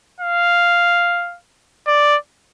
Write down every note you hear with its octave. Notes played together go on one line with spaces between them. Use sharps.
F5
D5